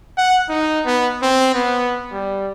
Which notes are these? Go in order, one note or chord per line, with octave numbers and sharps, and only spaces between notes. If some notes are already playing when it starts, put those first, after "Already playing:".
F#5
D#4
B3
C4
B3
G3